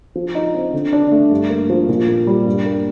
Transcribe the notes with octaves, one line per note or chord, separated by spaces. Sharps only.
F3
D#4
C4
D3
D4
A3
G2
A#3
F3
A#2
A#3
G3
G2
A#3